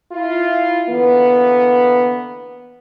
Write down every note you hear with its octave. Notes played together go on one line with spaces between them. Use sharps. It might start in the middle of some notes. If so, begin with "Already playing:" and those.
E4 F4
D3 E3 A#3 B3